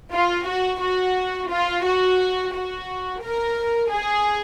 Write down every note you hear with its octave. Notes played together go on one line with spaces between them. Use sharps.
F4
F#4
F#4
F4
F#4
F#4
A#4
G#4